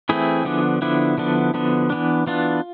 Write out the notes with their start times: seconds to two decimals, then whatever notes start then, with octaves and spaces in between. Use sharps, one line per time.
0.09 E3 A3 C4 E4 G#4
0.45 D3 F3 B3 D4
0.82 D3 F3 B3 D4 E4
1.18 D3 F3 B3 D4
1.54 D3 F3 B3 D4
1.90 E3 B3 D4
2.27 E3 B3 D4 F4